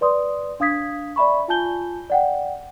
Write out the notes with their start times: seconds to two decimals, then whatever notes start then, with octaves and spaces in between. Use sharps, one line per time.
0.01 B4 D5 C6 D#6
0.60 D4 F5 D#6 G#6 B6
1.16 D5 E5 B5 C#6
1.48 F4 G#5 A5 G6 G7
2.10 D5 F#5 G5